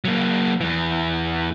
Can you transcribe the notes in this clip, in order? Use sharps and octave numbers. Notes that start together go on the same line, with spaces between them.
F#3 A#3
E2 E3